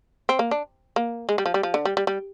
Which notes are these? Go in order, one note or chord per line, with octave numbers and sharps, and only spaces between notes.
C4
A#3
D4
A#3
G#3
G3
F3
G3
F3
D3
G3
G3
G3